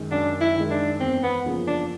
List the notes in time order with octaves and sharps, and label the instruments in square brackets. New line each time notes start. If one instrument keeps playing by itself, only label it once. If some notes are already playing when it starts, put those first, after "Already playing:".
Already playing: [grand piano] F#2 D#3 G#3
[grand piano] F#2 [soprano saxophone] D4
[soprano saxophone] E4
[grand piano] D#3 G#3
[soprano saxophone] D4
[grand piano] E2 [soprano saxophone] C4
[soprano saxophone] B3
[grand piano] C#3 F3 A#3
[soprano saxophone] D4